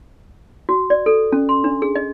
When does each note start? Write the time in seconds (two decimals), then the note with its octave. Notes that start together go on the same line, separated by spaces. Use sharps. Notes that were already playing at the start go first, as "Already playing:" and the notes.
0.69 F#4
0.90 D5
1.06 A4
1.32 C#4
1.49 C6
1.64 D4
1.82 G#4
1.95 D#5